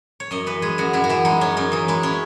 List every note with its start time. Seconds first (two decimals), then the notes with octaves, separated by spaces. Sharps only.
0.20 C#5
0.31 F#2 D#5
0.46 E3 B4
0.62 G#3 G#4
0.78 F#2 F#4
0.93 F#2 E4
1.04 F#4
1.09 E3 E4
1.25 G#3 D#4
1.41 F#2 C#4
1.57 F#2 D#4
1.72 E3 D#4
1.88 G#3 E4
2.03 C#4